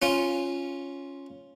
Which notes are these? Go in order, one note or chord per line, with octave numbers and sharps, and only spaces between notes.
C#4 F4